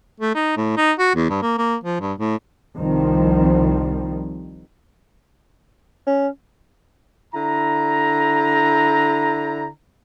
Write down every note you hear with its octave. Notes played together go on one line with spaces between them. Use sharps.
A3
D#4
A2
D#4
F#4
E2
G2
A#3
A#3
F3
G2
A2
C2 D#3 F3 G3 C4
C#4
D3 E4 A#5